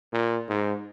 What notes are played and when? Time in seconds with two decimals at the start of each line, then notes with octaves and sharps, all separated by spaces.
0.13 A#2
0.49 G#2